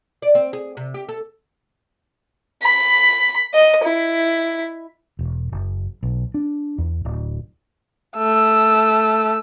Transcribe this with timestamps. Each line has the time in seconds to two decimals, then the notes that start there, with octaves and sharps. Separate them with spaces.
0.22 D5
0.35 C4
0.53 G#4
0.77 C3
0.94 G4
1.09 A4
2.63 B5
3.54 D#5
3.85 E4
5.19 E1
5.52 F#1
6.03 B1
6.34 D4
6.78 E2
7.05 D1
8.17 A3 E6